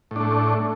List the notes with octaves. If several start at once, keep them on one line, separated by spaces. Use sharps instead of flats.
A2 A3 D4